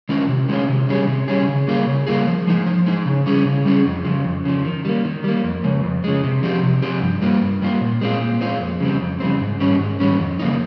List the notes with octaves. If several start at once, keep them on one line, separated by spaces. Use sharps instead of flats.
D#3 G#3 C#4 F4
C3
D#3 G#3 C#4 F4
C3
D#3 G3 C#4 G#4
C3
D#3 G3 C#4 G#4
C#3
G3 A#3 F4 G#4
C#3
G3 A#3 F4 G#4
F3
G#3 D#4
F3
G#3 D#4
C#3
G3 C#4 G#4
C#3
G3 C#4 G#4
F2
C#3 F3
F2
C#3 F3
D#3
G3 A#3
D#3
G3 A#3
F2
C#3 G#3
F2
C#3 G#3
C3
F3 C4 G4
C3
F3 C4 G4
G2
G3 A#3 F4
G2
G3 A#3 F4
A#2
G#3 C4 F4
A#2
G#3 C4 F4
F2
C#3 G3 C4
F2
C#3 G3 C4
G#2
D#3 G3 C#4
G#2
D#3 G3 C#4
F2
C#3 F3 A#3 D#4